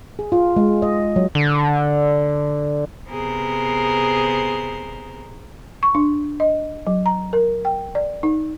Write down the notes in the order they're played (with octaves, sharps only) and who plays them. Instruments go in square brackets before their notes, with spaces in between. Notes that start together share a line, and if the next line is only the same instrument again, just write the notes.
[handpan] G#4
F4
G#3
D#5
F#3
[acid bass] D3
[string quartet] C3 B3 G#4 A#4 C5
[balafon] C#6
D4
D#5
F#3
A#5
A#4
G5
D5
D#4